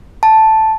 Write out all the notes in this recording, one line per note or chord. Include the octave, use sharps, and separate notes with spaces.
A5